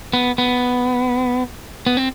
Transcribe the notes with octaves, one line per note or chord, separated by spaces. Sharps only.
B3
B3
B3
C4